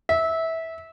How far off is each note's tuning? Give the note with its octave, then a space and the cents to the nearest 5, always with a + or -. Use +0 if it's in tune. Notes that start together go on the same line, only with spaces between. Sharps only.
E5 -20